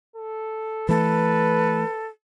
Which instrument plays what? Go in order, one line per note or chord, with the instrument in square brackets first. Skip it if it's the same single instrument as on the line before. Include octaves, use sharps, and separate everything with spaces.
[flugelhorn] A4
[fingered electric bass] E3 A3 [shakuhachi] A4 [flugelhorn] B4